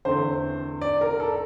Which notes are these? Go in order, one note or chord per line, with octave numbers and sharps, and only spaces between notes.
E2 D3 A3 C4 C5
D5
A#4
A4